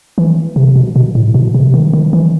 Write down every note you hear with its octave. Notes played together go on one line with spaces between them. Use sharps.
E3
C3
B2
B2
A2
B2
C3
D#3
D#3
E3